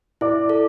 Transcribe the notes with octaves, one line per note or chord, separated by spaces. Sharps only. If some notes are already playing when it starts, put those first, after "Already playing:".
E4 D5 D6
A4